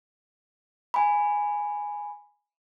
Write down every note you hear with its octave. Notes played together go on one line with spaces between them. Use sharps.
G#5 B5